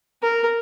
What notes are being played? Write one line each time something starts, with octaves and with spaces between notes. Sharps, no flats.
A#4